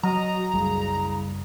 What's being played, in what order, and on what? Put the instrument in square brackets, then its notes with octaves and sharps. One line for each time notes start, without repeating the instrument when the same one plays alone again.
[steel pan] F#3 [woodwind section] F#4 D#5 [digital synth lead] A#5
[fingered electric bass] F#1 G3 [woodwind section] C2 C#3